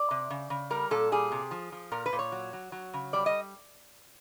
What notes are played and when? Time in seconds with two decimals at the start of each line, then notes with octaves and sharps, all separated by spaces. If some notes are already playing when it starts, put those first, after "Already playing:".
Already playing: D5
0.11 C3
0.30 C#3
0.50 C#3
0.70 G3 A#4
0.91 A#2 A4
1.12 G3 G#4
1.32 C3
1.51 F3
1.72 F3
1.92 A#2 A#4
2.06 B4
2.13 A#2
2.19 C#5
2.32 F#3
2.53 F#3
2.72 F#3
2.94 C#3
3.13 G3 D5
3.26 D#5